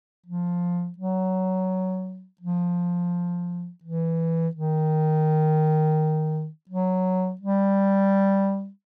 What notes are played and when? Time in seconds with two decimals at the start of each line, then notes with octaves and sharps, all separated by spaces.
0.26 F3
0.98 F#3
2.41 F3
3.84 E3
4.55 D#3
6.69 F#3
7.41 G3